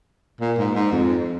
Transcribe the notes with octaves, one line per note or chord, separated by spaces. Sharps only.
A#2
G#2
G#2
F2